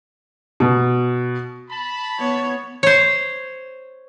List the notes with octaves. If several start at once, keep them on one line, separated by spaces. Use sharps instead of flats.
B2
A5 B5
B3 C#5
C5 C#5